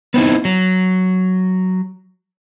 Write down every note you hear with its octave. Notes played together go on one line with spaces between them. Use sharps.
B3 C4 D#4 E4
F#3